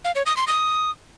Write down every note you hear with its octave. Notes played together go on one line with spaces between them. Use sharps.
F5
C#5
D#6
C6
D#6